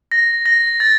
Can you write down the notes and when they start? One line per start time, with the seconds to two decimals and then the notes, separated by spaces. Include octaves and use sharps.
0.12 A#6
0.46 A#6
0.80 A6